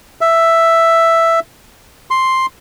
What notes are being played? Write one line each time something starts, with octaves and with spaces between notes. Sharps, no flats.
E5
C6